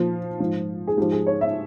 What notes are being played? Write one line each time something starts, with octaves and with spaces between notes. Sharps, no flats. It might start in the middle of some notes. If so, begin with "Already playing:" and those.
Already playing: A#2 F3 F4
G#2 F3
G#4
G#2 F3 G4
G#4
C#5
E5